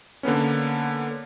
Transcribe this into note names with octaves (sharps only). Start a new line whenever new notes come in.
D3 A#3 B3 C#4